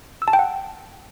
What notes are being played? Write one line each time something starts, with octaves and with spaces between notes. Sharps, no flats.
E6
A5
G5
F#5